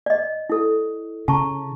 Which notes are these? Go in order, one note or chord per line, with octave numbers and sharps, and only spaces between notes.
D5 D#5
E4 A4
C#3 A5 A#5 C#6